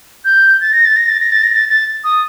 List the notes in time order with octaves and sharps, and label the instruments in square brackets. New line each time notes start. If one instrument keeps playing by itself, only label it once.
[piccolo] G6
A6
A#6
A6
A#6
A6
A#6
A6
A#6
A6
A6
D#6